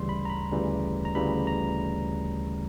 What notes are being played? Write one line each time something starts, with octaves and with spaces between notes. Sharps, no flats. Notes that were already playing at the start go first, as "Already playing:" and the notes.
Already playing: D2 C#3 E3 G3 C6
B5
A#5
B5
D2 C#3 E3 G3
A#5
D2 C#3 E3 G3 B5
A#5